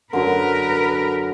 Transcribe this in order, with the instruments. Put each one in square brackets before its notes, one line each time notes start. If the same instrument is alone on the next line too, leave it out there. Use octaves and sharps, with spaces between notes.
[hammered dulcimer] F#2 D3 [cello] A#4 B4